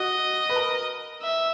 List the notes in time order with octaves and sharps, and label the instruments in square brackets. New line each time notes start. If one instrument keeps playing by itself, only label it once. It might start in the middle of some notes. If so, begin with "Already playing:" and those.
Already playing: [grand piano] F#4 [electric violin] D#5
[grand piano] B4
A#4
[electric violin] E5